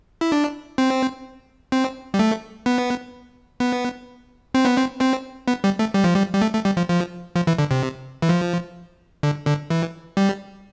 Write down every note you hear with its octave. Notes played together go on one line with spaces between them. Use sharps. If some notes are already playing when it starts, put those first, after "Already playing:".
E4
D4
C4
C4
G3
A3
B3
B3
C4
B3
C4
C4
B3
G3
A3
G3
F3
G3
G3
A3
A3
G3
F3
F3
F3
E3
D3
C3
E3
F3
D3
D3
E3
G3